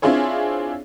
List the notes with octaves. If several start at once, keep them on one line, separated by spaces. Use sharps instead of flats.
C4 D4 E4 F4 G#4 C#5